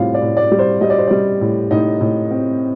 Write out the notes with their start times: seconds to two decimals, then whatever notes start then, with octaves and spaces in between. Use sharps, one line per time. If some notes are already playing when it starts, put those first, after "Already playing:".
Already playing: A2 G3 C4 F4 F5
0.14 D5
0.22 A2
0.37 D5
0.51 G3
0.59 C5
0.81 G3 D#5
0.90 D5
0.98 C5
1.08 G3 D5
1.41 A2
1.71 A2 D#4 D#5
2.01 A2
2.31 C4